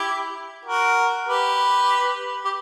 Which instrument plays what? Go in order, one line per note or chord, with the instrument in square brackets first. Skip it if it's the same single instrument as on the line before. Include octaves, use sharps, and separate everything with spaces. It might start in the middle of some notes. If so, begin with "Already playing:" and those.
Already playing: [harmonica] E4 G4
F#4 A#4
G4 B4
G4